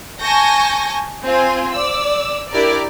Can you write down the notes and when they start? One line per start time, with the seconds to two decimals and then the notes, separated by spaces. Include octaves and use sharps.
0.20 G#5 A5 C#6 G6 A#6
1.23 C4 F4 G#5
1.73 D5 E6
2.51 D4 E4 G4 A#4 D5